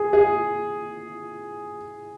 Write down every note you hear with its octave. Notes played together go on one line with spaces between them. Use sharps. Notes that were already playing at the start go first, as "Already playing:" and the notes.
Already playing: G#4
G#4